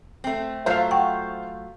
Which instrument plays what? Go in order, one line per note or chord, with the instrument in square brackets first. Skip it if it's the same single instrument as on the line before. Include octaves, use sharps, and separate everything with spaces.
[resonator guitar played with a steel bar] A3 C4
[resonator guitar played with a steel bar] F#3 A3 F4 [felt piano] C5 F5
[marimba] F#5 G5 C#6